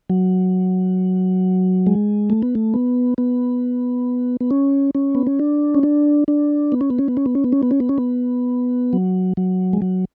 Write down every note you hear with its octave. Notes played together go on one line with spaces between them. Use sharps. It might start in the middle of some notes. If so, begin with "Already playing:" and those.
F#3
G#3
A3
B3
A3
B3
B3
B3
C#4
C#4
B3
C#4
D4
C#4
D4
D4
B3
C#4
B3
C#4
B3
C#4
B3
C#4
B3
C#4
B3
C#4
B3
C#4
B3
F#3
F#3
G#3
F#3